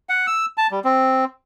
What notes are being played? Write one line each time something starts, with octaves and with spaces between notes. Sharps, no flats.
F#5
E6
A5
G3
C4